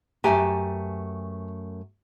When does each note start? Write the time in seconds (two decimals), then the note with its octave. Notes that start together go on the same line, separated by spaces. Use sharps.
0.24 F#2 A3 G4 B4 G#5 A#5